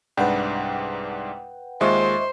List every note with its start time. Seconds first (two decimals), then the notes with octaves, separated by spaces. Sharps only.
0.17 C2 G#2 D4 B4 F#5 G5
1.81 D#2 G#3 F4 C5 D#5 E5 C#6